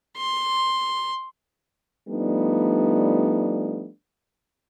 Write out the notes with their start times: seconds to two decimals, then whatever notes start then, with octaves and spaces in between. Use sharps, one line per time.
0.17 C6
2.09 F3 G3 A3 B3 D4 D#4